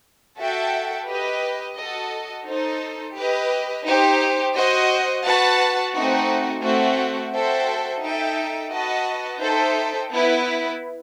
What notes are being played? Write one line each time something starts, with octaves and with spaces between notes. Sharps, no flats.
F#4 A4 E5 G5
G4 B4 D#5
F#4 A4 D#5
D#4 A4 C5
G4 B4 D#5
D#4 G4 C5
F#4 C5 D#5
F#4 B4 F#5 A5
A3 C4 D#4 F#4
A3 C4 F#4
F#4 A4 C5 E5 G5
D#4 A4 E5 G5
F#4 B4 D#5 F#5 A5
D#4 A4 C5 E5 G5
B3 E4 B4